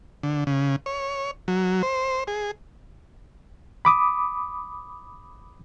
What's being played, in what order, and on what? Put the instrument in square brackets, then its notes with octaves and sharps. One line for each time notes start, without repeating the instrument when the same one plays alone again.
[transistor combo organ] D3
C#3
C#5
F#3
C5
G#4
[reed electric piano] B5 D6 D#6